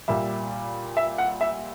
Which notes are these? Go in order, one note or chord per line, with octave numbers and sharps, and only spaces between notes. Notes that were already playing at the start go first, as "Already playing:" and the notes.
A#2 G3 E5
E5
F#5
E5